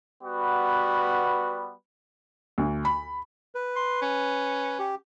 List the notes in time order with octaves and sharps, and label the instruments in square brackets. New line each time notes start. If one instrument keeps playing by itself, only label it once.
[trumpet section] G3 B3 F#4 B4
[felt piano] D2
B5
[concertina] B4
[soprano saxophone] C6
C#4
[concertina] G4